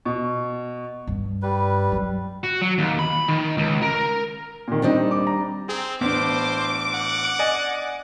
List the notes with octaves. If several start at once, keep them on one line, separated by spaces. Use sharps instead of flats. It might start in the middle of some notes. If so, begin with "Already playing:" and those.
B2
G2
G3 B4
F#3
F#4
F#3
D#2
B5
D#3
C#2
A#4
A#2 D#3
D#3 G3 C4 D4 D#4
D6
A#5
C4 G#4
A1 B3 D4 C5 D6
F#5
D5 D#5 G#5